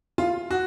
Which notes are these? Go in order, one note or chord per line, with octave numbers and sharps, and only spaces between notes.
F4
F#4